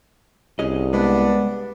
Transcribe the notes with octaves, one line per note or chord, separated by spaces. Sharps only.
C2 C#4 G#4 D#5
G#3 B3 D4